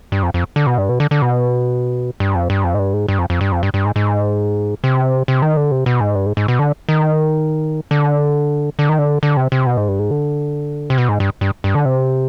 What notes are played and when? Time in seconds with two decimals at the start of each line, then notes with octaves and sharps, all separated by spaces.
0.12 G2
0.23 F2
0.34 F2
0.56 D3
0.67 B2
0.78 G2
0.89 B2
1.00 D3
1.11 D3
1.22 B2
2.20 G2
2.35 F2
2.50 G2
2.64 F2
2.74 G#2
2.79 G2
2.93 G#2
3.08 G2
3.19 F2
3.30 F2
3.41 G2
3.52 F2
3.63 G2
3.74 G2
3.85 G#2
3.96 G#2
4.84 C3
5.28 C3
5.42 D#3
5.57 D3
5.71 C3
5.86 B2
6.01 G#2
6.15 G2
6.26 G#2
6.37 G#2
6.48 B2
6.59 D3
6.89 D#3
7.91 D3
8.79 D3
8.89 D#3
8.99 D3
9.23 D3
9.37 C3
9.52 C3
9.66 B2
9.77 G#2
9.88 G2
9.99 G#2
10.11 D3
10.90 C3
10.98 B2
11.09 G#2
11.20 G2
11.41 G2
11.64 G2
11.75 D3
11.85 C3